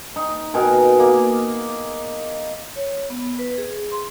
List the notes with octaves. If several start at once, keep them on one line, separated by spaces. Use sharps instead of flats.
D#4
B2 D#4 G#4 A#4
A#3
C#5
B3
B4
G#4
C6